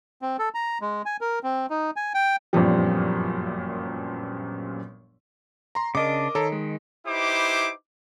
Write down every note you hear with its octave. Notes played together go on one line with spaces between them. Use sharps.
C4
A4
A#5
G#3
G#5
A#4
C4
D#4
G#5
G5
G1 F#2 A#2 F3 G3
A#5 C6
C#3 D4 A#4 D#5 D6
D#3 A4 C#5 A#5
G#3
D#4 E4 G4 B4 C5 D6